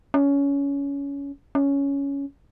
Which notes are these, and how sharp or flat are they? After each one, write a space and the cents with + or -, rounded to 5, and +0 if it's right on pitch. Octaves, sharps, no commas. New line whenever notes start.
C#4 +20
C#4 +10